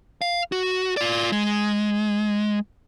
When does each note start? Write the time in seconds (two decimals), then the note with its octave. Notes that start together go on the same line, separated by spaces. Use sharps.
0.22 F5
0.52 F#4
0.97 F4 D5
1.32 G#3